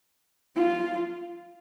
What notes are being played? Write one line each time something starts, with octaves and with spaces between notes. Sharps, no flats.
F4